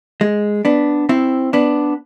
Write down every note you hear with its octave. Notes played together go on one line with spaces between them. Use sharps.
G#3
B3 D4
C4 E4
B3 D4